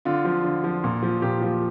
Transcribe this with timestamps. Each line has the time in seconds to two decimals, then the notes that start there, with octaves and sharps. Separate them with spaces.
0.05 D3 F4
0.25 F3
0.45 D3
0.64 F3
0.84 A#2
1.03 F3
1.22 A#2 G4
1.42 F3